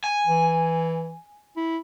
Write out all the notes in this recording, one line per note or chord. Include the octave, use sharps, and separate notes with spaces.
G#5
E3
E4